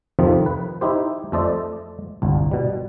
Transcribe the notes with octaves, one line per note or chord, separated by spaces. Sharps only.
F2 C3 D#3 F3 C4 D#4
B4
D#4 E4 G4 C5
F2 A3 A4 C5 D5 D#5
G1 C2
B2 G3